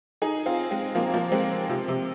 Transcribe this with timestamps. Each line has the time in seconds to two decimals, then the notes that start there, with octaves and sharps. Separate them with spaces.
0.22 D#4 G#4
0.46 C4 F4
0.71 G#3 C4
0.95 F3 A#3
1.14 F3 A#3
1.32 G#3 C4
1.69 C3 F3
1.88 C3